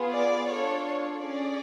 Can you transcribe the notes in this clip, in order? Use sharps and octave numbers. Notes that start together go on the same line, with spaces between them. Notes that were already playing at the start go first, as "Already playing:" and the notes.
Already playing: B3 F4 G#4
D5
D4 F4 A4 C#5
C#5
C#4 G#4 D5